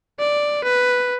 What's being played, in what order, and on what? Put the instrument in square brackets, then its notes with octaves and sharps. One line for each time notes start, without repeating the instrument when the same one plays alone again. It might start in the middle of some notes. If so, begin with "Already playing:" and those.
[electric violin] D5
B4